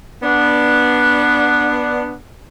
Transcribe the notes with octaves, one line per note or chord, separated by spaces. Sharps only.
B3 D4